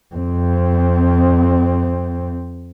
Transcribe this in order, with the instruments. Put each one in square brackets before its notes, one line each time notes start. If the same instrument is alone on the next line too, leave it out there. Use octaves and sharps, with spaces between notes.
[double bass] F2 C4